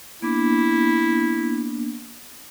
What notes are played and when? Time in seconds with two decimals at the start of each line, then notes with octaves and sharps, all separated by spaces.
0.22 A#3 B3 D4 E4